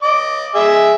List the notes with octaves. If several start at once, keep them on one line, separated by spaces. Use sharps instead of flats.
D#5 D6
G#4 D#5 E5